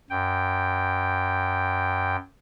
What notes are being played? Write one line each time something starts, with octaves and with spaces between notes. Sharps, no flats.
F#2 G5